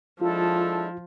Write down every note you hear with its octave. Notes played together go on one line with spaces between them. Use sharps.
F3 G#3 D4 E4 F4 A4